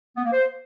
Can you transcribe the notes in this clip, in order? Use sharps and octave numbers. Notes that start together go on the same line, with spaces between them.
B3
A#3
C5